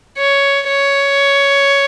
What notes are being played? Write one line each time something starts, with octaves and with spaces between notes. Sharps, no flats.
C#5
C#5